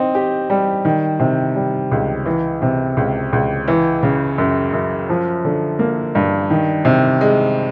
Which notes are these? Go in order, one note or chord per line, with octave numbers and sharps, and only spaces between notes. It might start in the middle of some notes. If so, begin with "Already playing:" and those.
Already playing: C4 D#4
G4
G3
D#3
C3
G3
C#2
E3
C3
C#2
C#2
E3
C#3
F#2
F#2
F3
D3
A#3
G2
D#3
C3
G#3